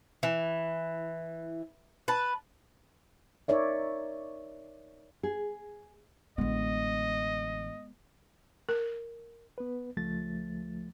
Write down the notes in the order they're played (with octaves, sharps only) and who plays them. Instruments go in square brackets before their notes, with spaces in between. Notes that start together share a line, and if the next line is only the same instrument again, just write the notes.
[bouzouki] E3
B4 A5
[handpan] D#4 A#4 C#5 D5 E5
[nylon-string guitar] G#4
[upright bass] A1 D3 [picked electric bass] G#3 B3 [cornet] D#5
[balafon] A#4
[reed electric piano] B3 B4
C#2 F3 A3 A6